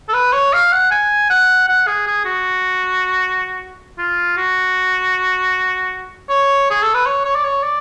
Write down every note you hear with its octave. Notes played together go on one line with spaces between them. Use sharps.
A4
B4
C#5
F5
F#5
G#5
F#5
F#5
G#4
G#4
F#4
F4
F#4
C#5
G#4
A4
B4
C#5
C#5
D5
C#5
D5